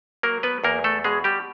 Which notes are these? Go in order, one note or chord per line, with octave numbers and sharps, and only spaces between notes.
F#3 A#3 A#4
B3 B4
E2 A#3 A#4
A3 A4
B2 G#3 G#4
G3 G4